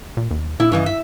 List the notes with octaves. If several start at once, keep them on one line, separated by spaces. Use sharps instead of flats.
A#2
D#2
A#2 E4
G2 C#3 E3 D#5
E5